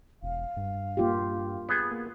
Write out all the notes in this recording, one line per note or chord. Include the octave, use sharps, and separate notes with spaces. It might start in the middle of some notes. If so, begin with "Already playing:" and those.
E1 F5
G2
A#3 F4 G4
B3 G#4
A#3